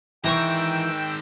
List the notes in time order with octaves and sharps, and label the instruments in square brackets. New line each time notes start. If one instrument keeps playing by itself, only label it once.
[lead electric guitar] D#3 G#3 [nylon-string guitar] E3 B4 [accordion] G5 E6 [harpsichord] A#5 C#6